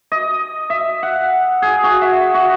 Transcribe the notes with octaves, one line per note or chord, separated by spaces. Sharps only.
D#5
E5
F#5
G#4
F#4
E5
F#4